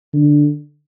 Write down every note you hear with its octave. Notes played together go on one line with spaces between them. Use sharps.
D3